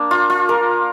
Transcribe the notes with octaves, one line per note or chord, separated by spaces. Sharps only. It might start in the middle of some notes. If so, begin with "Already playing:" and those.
Already playing: A#3 D4
F4
F4
A#4